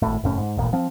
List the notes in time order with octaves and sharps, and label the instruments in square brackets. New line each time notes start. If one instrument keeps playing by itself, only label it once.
[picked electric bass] G#1 A2
F#1 A2 C#4
G#2
D#1 A1 A#2
F3 C4